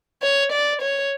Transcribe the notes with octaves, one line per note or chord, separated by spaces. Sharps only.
C#5
D5
C#5